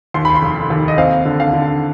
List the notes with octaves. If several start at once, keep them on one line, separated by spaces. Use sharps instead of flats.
D#2 C6
B5
C6
F1
D#2
D#5
C4 F5
D3
F5
D3